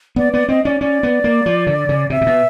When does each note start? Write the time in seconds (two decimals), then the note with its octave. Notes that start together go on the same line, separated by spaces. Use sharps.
0.16 B3 D5
0.33 B3 D5
0.49 C4 D#5
0.65 C#4 D5
0.81 C#4 D5
1.03 B3
1.24 A#3
1.46 F3
1.67 D3
1.89 C#3
2.10 C3 E5
2.21 C3
2.26 B2